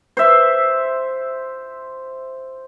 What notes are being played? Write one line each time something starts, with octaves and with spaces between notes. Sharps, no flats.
C5 E5